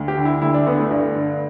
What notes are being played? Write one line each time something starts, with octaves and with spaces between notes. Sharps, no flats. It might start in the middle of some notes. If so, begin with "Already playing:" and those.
Already playing: D2
G4
D3
E4
D2 E4
D4
D3 B3
A3
G2 G3
D3